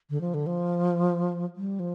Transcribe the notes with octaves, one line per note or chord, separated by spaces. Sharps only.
D3
F3
D3
F3
G3
F3